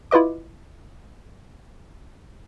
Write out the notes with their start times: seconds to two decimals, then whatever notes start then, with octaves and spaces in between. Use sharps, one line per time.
0.11 E4 F4 B4 D#5 D6